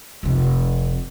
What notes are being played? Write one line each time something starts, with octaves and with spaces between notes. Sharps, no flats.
F1 C3